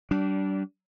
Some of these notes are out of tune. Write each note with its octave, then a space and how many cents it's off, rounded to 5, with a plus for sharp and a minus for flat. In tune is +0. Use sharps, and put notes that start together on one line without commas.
G3 -35 D4 -15